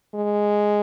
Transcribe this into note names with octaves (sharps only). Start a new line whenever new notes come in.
G#3